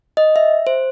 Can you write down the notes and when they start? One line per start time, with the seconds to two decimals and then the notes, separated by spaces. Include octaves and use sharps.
0.17 D#5
0.36 E5
0.67 C5